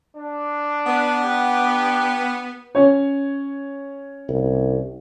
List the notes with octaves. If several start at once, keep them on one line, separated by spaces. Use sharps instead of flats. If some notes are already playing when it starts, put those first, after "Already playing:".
D4
B3
D4 G4
C#4 C#5
C2